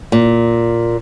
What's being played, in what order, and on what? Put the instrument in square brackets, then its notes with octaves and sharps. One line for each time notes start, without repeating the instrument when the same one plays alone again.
[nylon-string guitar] A#2